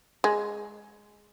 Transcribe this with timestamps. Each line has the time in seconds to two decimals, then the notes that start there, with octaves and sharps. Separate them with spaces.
0.24 G#3